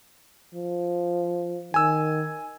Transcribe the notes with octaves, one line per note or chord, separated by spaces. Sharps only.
F3
D#3 G#5 E6